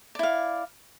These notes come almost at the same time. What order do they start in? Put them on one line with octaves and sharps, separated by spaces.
D5 E4 F5